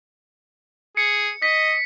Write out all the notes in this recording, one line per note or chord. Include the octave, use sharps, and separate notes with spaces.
G#4 C#7
D#5 B6